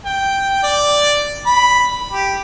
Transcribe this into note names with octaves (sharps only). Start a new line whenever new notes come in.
G5
D5
B5
G4